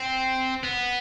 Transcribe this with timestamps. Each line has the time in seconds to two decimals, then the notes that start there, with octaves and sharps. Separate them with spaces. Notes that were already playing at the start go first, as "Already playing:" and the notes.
Already playing: C4
0.63 B3